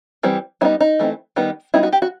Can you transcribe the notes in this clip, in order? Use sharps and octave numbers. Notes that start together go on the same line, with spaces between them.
E3 G3 C4
G3 B3 D#4 E4
D#4
E3 A3 C4
D#3 G3 B3 D#4
G3 B3 D#4 E4
F#4
G4
F#4